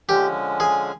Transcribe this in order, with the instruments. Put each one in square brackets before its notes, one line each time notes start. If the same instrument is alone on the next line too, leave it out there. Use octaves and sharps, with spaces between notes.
[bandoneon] D3 F3 G#3 C#4 [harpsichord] G4
[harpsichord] G#4